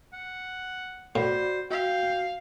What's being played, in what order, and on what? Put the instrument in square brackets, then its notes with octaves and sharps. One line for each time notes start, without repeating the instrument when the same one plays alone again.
[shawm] F#5
[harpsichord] A2 [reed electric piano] F#4 D5 B5 [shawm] C5
[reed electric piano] F#4 [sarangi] F5 [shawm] G5